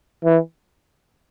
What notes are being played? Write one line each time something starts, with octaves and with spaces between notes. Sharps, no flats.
E3